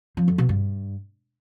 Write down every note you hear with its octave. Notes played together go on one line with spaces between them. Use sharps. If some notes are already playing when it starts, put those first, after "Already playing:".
F3
F2
B2
G2